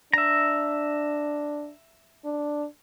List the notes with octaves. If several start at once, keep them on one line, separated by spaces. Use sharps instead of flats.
D4 E5 A#5
D4